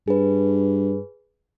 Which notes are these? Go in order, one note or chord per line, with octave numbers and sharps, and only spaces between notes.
G2 G#4 B4